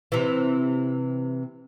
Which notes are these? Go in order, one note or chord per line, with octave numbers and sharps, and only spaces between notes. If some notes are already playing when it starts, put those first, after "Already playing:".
C3 E3